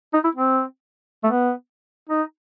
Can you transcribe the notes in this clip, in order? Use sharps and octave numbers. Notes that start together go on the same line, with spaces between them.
D#4
E4
C4
A3
B3
D#4